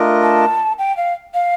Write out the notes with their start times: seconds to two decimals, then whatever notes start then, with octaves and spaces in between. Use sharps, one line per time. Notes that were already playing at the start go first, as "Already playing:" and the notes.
Already playing: A3 D4 F4 A#4 D#5
0.23 A5
0.78 G5
0.97 F5
1.34 F5